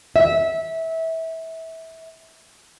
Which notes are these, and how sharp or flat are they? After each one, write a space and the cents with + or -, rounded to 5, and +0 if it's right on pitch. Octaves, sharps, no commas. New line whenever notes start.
E5 -20